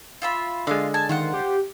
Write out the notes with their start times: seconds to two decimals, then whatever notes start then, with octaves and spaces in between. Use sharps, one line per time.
0.22 F4 E5 B5
0.67 D3 G#3 F4 F5
0.94 G#5 A5
1.09 D#3 F4 C5 F#5
1.34 G4